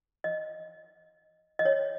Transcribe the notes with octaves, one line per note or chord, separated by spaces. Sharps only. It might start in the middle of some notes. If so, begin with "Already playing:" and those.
D#5
D#5
C#5